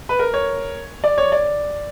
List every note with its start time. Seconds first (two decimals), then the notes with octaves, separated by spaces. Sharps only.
0.09 B4
0.19 A#4
0.34 C#5
1.04 D5
1.18 C#5
1.32 D5